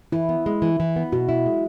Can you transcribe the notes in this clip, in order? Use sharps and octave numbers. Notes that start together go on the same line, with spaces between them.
E3 E4
B3
G#3
E3
E3
B3
B2 F#4
E4
G#3